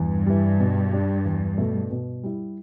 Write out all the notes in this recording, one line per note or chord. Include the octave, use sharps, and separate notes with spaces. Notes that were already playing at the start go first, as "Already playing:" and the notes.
Already playing: E2 G2
E3 G3
B2
G3 D4
E2
B2 A3
B2
G3 E4